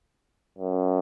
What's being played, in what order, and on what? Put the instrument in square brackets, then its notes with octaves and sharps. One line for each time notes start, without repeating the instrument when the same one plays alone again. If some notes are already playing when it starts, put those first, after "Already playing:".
[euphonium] F#2